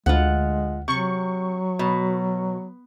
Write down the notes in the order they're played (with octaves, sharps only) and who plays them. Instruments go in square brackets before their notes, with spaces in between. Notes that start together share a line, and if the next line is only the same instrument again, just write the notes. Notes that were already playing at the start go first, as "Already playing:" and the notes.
[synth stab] D2 [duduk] G#3 [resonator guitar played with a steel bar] F4 F#5
[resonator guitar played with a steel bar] C3 [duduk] F#3 [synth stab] C#6
[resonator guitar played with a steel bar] B2